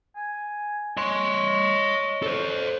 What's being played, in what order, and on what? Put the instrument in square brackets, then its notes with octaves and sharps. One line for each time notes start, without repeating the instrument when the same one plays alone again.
[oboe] G#5
[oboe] C#5 [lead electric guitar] D#5 C6
[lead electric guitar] A4 C5